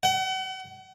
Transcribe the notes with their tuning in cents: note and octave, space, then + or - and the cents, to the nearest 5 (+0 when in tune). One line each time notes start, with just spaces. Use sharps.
F#5 +40